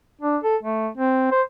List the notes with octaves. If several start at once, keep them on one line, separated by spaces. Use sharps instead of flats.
D4
A4
A3
C4
C5